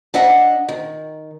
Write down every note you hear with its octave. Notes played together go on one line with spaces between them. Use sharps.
D4 D#5 E5 F#5
D#3